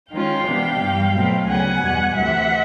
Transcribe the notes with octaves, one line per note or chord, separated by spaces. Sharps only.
D#3 G#3 C#4 F4 F5 G5
C3 E3 G#3 B3 D4
G2 E3 G3
B2 F#3 A3 C4
D2 C#3 F#3 B3 F#5 G#5
E2 B2 G3
D2 C3 E3 E5 F#5